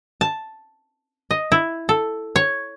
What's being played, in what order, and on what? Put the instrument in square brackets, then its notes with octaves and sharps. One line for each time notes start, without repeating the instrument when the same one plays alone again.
[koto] A5
D#5
E4
A4
C#5